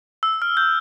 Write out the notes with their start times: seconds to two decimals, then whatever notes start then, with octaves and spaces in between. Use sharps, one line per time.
0.23 E6
0.42 F6
0.57 G6